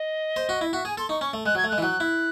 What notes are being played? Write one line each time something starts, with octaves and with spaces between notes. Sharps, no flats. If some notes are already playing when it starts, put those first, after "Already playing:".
Already playing: D#5
C5
F#4
E4
F#4 E5
G#4 G#5
A4 C6
D#4 C#6
C#4 C#6
A3
G#3 F#6
F#3 G#6
A3
G#3 F#6
E3
F#3 F#6
E4